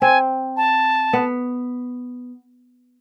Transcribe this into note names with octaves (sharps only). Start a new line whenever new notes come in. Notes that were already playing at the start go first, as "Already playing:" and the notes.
C4 G#5
A5
B3